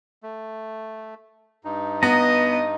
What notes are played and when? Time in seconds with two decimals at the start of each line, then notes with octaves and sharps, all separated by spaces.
0.23 A3
1.64 G2 D#4
2.03 B3 D#5 A#5